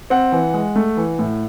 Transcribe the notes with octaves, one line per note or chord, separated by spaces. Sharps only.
C4 F#5
E3
G#3
A3
E3
A2